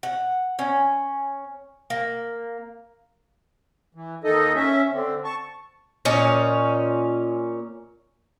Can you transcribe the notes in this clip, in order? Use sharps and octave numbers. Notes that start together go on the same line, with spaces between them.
F#5
C#4
A#3
E3
D#2 D#3 D#4 A4 D#5
C#4 E5
D3 C4
A5 C#6
A#2 C#4 D#4